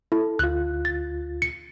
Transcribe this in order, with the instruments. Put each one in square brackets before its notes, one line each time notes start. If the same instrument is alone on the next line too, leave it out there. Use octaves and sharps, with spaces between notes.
[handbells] E4 [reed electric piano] A4
[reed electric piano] D2 F4 [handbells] F#6
[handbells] A6
C#7